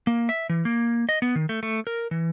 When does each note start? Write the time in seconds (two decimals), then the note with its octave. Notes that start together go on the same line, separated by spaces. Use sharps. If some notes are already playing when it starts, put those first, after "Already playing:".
0.07 A#3
0.29 E5
0.49 E3
0.65 A#3
1.09 D#5
1.22 B3
1.36 D#3
1.49 A3
1.63 A3
1.87 A#4
2.11 E3